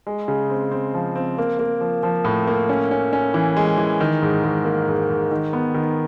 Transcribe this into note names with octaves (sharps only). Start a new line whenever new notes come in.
G#3
C#3
C4
C4
F3
C4
A#3
A#3
F3
F3
A2
A#3
C#4
C#4
C#4
E3
G#3
E3
D#3
G#2
G#2
A#3
G#2
G#2
D#3
B3
D#3